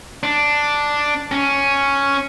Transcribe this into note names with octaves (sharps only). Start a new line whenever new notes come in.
D4
C#4